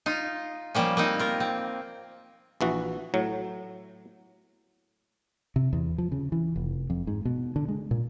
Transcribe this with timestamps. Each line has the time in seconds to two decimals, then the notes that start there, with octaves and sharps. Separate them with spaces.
0.06 D#4 F4
0.75 F3 G3 A#3 C#4
0.97 A#3 C4 D#4
1.19 F4 A#4
1.40 C4
2.61 A#1 E3 F#4
3.14 A2 F#3
5.56 C3
5.73 E2
5.98 F3
6.12 C#3
6.32 E3
6.56 F1
6.90 F2
7.07 G#2
7.25 B2
7.56 D3
7.68 G#3
7.91 A#2